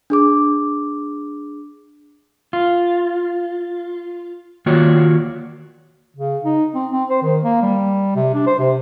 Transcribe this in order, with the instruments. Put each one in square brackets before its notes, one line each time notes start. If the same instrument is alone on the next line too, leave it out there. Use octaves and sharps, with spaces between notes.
[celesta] D4 G#4 D6
[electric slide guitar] F4
D#3 A#3 F4 F#4 C#5 D5
[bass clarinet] C#3
D#4
C4
C4
C5
D#3
A#3
G3
C3
D4
C5
C3